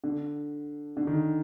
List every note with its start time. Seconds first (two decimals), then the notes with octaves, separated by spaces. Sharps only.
0.04 D3
0.97 D3
1.07 D#3